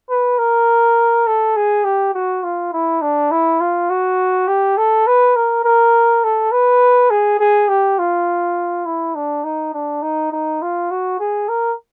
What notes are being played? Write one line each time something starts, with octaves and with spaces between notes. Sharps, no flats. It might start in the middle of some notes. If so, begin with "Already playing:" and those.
B4
A#4
A4
G#4
G4
F#4
F4
E4
D4
E4
F4
F#4
G4
A4
B4
A#4
A#4
A4
B4
G#4
G#4
G4
F4
E4
D4
D#4
D4
D#4
D#4
F4
F#4
G#4
A#4